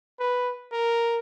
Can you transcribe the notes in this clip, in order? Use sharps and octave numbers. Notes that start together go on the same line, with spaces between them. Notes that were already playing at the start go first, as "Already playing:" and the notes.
B4
A#4